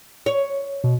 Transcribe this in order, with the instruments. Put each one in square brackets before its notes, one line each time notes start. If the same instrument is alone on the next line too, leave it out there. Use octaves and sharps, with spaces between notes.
[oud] C#5
[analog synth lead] B2